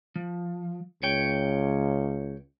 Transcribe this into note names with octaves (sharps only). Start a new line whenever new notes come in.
F3
C#2 C#5 G5